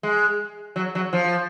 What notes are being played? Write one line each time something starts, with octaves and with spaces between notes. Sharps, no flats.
G#3
F#3
F#3
F3